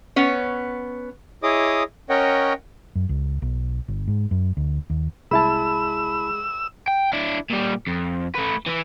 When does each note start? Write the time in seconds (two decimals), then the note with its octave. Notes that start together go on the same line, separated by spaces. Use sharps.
0.16 B3 C#4 C#5
1.43 E4 G#4 C#5 D#5 D6 D#6
2.09 C#4 A#4 C#5 D#5 F#5 G5
2.95 F#2
3.09 C#2
3.42 B1
3.88 G1
4.08 G#2
4.31 F#2
4.57 D2
4.90 D#2
5.31 C2 G#3 E4 A5 B5 E6
6.88 G5
7.13 D4 E4
7.50 A#2 G3
7.87 F2
8.36 A3 B4
8.67 E3 E4